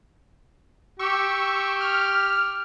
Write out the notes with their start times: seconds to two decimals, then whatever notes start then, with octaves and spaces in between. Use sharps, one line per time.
0.99 G4 C#6 E6
1.81 F6